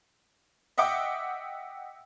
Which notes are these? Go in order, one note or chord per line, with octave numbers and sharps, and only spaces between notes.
D#5 E5 F#5 G5 D6